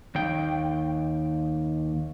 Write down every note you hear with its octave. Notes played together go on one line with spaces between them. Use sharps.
D#2 G5